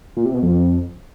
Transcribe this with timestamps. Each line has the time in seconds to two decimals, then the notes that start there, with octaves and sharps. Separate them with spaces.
0.17 A#2
0.25 C3
0.34 B2
0.43 F2